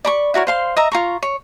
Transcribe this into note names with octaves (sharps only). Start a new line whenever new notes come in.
D5 B5 C#6
E4 F#4 A#4 C#5
C5 F5 C6
D#5 E5 A#5
F4 A#5 C#6
C#5